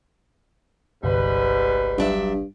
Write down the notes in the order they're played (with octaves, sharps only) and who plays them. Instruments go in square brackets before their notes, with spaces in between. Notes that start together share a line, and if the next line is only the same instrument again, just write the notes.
[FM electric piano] G1 C2 [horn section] G#2 G3 B4
[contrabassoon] G2 [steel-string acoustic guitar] F#3 D4 E5